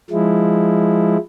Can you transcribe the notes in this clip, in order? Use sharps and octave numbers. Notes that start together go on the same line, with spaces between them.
F3 G#3 E4